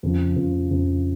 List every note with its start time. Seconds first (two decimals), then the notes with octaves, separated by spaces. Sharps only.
0.03 F2 C#3 F3
0.36 F2 C#3 F3
0.71 F2 C#3 F3